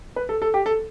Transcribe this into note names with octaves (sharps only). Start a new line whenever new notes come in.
B4
A4
A4
G4
A4